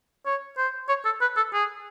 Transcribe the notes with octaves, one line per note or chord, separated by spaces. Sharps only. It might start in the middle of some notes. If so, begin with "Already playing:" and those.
C#5
C5
C#5
A4
B4
A4
G#4